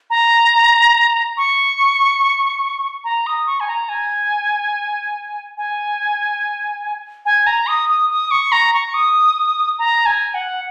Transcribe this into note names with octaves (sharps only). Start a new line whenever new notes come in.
A#5
C#6
A#5
D#6
C#6
G#5
A#5
G#5
G#5
G#5
A#5
D#6
D#6
D#6
C#6
A#5
C#6
D#6
A#5
G#5
F#5